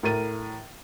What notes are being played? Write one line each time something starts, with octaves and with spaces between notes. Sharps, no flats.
A2 A#4 A6 D#7